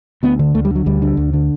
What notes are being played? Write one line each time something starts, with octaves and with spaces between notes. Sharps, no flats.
D2 B3
D3
D2 A3
G3
D3 F#3
D2 G3
D3
D2
D3